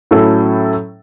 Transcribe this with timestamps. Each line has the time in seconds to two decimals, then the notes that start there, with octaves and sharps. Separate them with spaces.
0.11 A2 F#3 C#4 E4 A4